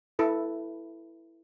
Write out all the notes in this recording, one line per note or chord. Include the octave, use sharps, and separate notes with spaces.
E4 A4 B4